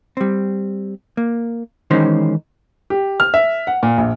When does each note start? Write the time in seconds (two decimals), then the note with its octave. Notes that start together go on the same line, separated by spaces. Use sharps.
0.17 G3 C4
1.17 A#3
1.91 D#3 E3 G#3 C#4 D#4 C5
2.90 G4
3.20 F6
3.34 E5
3.67 F#5
3.83 A#2
3.98 A#1